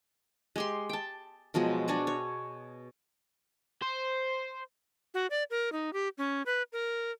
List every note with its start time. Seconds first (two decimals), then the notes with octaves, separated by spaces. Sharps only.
0.56 G#3 G4 C6
0.89 G5 A5
1.54 B2 F3 F#3 G#3
1.88 D4 F#4 G#4 C#5
2.07 C#5
3.82 C5
5.14 F#4
5.30 D5
5.50 A#4
5.72 D#4
5.93 G4
6.18 C#4
6.46 B4
6.72 A#4